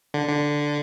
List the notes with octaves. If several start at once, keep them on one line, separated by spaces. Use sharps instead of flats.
D3
D3